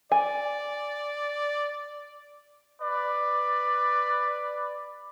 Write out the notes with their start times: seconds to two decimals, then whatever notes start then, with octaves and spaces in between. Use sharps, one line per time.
0.12 D5 G#5
2.81 B4 D5